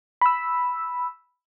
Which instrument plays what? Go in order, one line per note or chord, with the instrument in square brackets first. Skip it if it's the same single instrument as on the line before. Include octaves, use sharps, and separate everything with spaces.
[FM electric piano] B5 E6